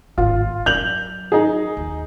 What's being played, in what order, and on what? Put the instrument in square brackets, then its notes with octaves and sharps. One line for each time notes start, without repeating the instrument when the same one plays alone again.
[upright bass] G#1 A2 [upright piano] F4
[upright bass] F#3 [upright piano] G6 F7 F#7
[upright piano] D#4 G#4
[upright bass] D#2